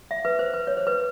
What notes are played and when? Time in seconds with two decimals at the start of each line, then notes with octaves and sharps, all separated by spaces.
0.11 E5
0.25 B4
0.39 C5
0.54 B4
0.67 C#5
0.77 C5
0.87 B4